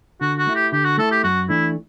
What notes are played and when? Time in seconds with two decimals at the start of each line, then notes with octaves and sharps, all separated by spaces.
0.21 D3 F#4
0.38 F#4
0.47 A3 E4
0.55 G4
0.72 D3 G4
0.85 F#4
0.98 A3 E4 A4
1.12 G4
1.24 F#2 F#4
1.49 E3 A3 D4 E4